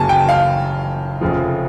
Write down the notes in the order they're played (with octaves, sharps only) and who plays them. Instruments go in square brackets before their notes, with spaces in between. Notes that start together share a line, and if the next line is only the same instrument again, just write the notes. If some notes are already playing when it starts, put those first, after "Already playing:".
Already playing: [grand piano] F#1 F#2 C#3 F#3 A#3 G#5 A5
G5
F5
F1 F2 C#3 F3